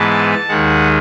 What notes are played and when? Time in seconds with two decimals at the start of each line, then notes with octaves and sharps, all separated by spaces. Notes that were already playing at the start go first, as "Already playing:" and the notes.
Already playing: G#2 E3 G#3 B3 A5
0.48 D#2 D#3 G#3 F#5